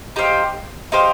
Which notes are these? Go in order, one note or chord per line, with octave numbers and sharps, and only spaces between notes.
D#4 G4 C5 F5
D#4 G4 C5 F5